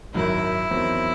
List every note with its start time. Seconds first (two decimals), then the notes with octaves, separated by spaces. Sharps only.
0.14 G#1 F#2 D#3 F#3 E4
0.71 E2 D#3 F#3 C4